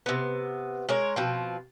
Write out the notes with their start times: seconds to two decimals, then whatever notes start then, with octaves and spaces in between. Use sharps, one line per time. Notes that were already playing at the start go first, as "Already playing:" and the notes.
0.06 C3 B3
0.89 G#3 A#4 C#5
1.16 B2 F3 C4